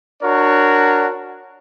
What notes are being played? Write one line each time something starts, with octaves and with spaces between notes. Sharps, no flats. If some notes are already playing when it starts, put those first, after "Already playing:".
D4 F#4 A#4 C#5